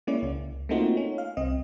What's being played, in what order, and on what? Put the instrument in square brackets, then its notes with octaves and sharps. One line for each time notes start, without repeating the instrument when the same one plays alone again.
[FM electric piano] G#3 A#3 C#4 E4 D5
C#2
A3 A#3 C4 D#4 F4 F#4
C#4
F5
C2 C4 D#5